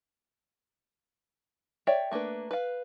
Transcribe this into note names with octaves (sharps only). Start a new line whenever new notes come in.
C#5 D5 E5 G5
A3 A#3 D4 B4
B4 F5